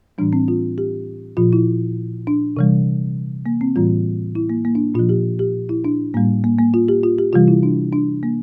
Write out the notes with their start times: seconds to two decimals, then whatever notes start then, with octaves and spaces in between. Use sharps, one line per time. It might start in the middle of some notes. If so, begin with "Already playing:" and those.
0.18 A2 E3 G3 D4
0.33 C4
0.48 F4
0.78 G4
1.37 A#2 F3 F4
1.53 E4
2.27 D4
2.57 C3 E3 G3
3.46 A#3
3.61 C4
3.76 A2 E3 G3 F4
4.35 E4
4.50 A#3
4.65 A#3
4.75 D4
4.94 A#2 F4
4.99 F3
5.09 G4
5.39 G4
5.69 E4
5.85 D4
6.14 A2 G3 A#3
6.44 A#3
6.59 A#3
6.74 F4
6.88 G4
7.04 F4
7.18 G4
7.33 C3 E3 G3 F4
7.48 E4
7.63 D4
7.93 D4
8.23 A#3